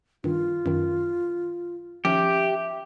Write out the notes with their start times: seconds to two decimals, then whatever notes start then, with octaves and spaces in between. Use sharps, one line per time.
0.24 G2 D#3 F4
0.66 F#2 D#3
2.05 D#3 F3 C#4 G4 E5